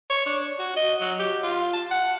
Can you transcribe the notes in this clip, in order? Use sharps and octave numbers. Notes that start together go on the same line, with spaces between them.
C#5
D4
F#4
D#5
F#3
G4
F4
A5
F#5